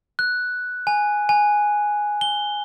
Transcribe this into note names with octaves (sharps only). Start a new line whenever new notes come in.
F#6
G#5
G#5
G7